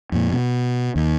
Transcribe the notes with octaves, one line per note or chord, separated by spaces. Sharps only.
F2 A#2
B2
D#2